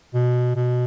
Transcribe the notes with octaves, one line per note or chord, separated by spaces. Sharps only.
B2
B2